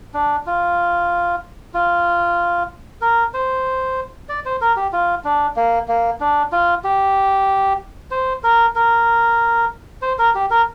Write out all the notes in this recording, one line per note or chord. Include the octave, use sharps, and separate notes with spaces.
D4
F4
F4
A#4
C5
D5
C5
A#4
G4
F4
D4
A#3
A#3
D4
F4
G4
C5
A#4
A#4
C5
A#4
G4
A#4